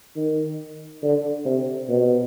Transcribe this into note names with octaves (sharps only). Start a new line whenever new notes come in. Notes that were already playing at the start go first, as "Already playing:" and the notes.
D#3
D3
C3
B2